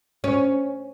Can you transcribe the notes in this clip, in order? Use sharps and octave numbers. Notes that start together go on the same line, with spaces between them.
C#4